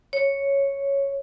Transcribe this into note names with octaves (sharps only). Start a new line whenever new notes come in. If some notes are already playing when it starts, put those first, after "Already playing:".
C#5